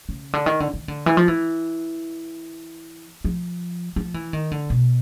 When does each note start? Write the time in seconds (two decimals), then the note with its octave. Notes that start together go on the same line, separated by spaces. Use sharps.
0.09 C#3
0.33 D3
0.46 D#3
0.60 D3
0.74 D#3
0.88 D3
1.06 E3
1.17 F3
1.28 E3
3.24 F3
3.96 F3
4.14 E3
4.33 D#3
4.51 D3
4.70 B2